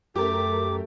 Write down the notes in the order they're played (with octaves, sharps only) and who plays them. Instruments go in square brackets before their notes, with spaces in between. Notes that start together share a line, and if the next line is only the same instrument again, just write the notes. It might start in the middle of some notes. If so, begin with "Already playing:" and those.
[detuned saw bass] F#2 [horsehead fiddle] A3 [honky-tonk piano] G4 A#4 [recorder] D6